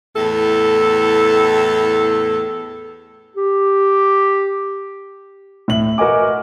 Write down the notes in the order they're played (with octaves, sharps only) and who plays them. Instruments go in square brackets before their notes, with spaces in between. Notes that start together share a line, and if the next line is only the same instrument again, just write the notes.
[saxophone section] E2 A2 A4
[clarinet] G4
[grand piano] A2 E5 F#7
F#4 A#4 B4 D#5 G#5 D6